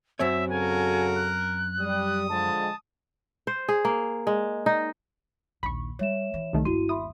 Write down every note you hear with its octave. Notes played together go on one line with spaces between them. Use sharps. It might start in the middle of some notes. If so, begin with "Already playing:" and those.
F#2 C4 C#5 E5
C#3 F#4 A4 A#4 G#5
F#6
G3 D#6
D3 F3 G#3 A5
C5
G#4
A#3
G#3
D#4
A#1 D#2 B5 C#6
G3 C#5 E5 E7
E3
C2 D#3 A3
G1 D#2 E4 F#4 C6 D#7
E5 B5 C6 D#6